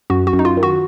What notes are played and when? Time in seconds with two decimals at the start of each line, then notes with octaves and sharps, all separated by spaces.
0.10 F#2 F#4
0.27 F#4
0.33 F#2
0.39 D#4
0.45 F4
0.57 D#3
0.63 F#4